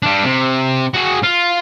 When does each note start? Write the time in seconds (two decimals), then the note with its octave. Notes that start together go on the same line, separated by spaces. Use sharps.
0.03 G3 D4
0.24 C3
0.94 F#4 G#4
1.23 F4